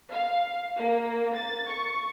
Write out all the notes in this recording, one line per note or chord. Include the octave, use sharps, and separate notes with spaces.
F5
A#3
A6
C#6